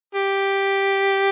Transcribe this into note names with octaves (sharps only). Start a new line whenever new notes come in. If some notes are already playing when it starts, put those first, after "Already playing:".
G4